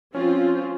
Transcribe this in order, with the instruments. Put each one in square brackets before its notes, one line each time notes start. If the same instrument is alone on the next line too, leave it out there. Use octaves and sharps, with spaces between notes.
[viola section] F3 C4 F4 [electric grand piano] C#4